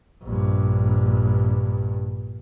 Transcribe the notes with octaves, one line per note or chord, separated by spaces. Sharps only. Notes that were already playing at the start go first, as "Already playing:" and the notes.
A#1 G2